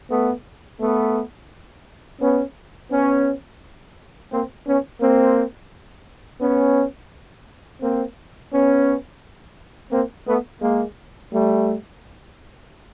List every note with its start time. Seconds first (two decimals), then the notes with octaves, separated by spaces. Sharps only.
0.10 A3 B3
0.80 A3 B3
2.20 B3 C#4
2.90 B3 C#4
4.31 A#3 C4
4.66 B3 C#4
5.01 A#3 C4
6.41 B3 C#4
7.81 A#3 C4
8.52 B3 C#4
9.92 A#3 C4
10.27 A3 B3
10.62 G#3 A#3
11.32 G3 A3